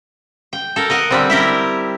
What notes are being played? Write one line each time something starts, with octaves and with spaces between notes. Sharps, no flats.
G5
A4 A#4
A#4 D#5 F#5
D3 G3 C4
E4 G4 A#4